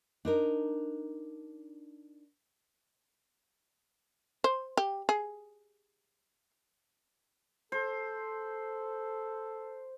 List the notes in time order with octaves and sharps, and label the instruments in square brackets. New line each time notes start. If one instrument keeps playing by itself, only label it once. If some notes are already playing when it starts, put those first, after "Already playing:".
[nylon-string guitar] D4 D#4 A#4
[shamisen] C5
G4
G#4
[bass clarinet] A4 [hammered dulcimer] C5